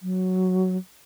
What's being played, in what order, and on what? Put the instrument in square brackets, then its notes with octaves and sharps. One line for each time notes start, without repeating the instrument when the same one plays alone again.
[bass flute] F#3